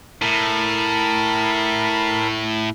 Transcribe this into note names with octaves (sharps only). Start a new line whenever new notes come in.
A2 A#4 A5 B5